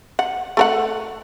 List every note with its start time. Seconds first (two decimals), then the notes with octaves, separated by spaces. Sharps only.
0.19 F#5
0.57 A3 A#4 F#5